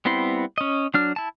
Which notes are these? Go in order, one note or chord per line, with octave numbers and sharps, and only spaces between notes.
G3 B3 C4 E4 C6
C#4 D#5
F#3 D4 F6
E4 A5